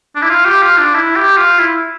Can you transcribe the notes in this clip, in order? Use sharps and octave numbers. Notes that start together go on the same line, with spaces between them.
D4
E4
F4
G4
F4
D4
E4
G4
F4
E4